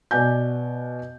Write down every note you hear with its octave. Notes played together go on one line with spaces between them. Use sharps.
B2 D5 G#5 G6